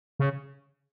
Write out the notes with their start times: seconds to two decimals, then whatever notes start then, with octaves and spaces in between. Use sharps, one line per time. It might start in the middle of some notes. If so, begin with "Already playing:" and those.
0.19 C#3